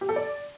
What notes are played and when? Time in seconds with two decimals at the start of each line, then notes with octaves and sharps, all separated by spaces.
0.01 G4
0.09 A4
0.16 D5